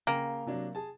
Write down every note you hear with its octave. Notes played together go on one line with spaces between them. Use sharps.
C#3 A#3 F5 G5
C3 F#3 D4
G#4 A5